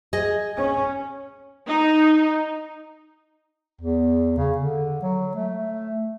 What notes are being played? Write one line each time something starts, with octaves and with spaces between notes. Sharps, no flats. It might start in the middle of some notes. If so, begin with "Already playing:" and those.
G#4 D#5
C#4
D#4
E2
C#3
D3
F#3
A3